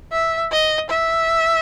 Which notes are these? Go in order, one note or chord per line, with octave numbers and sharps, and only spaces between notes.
E5
D#5
E5